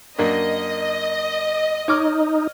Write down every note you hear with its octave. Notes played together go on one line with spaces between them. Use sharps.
F#2 A#3 D4 D#5
D#4 C#5 D6 F6